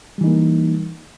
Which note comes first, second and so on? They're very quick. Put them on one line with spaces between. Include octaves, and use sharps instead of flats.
G3 E3 D#4 A#3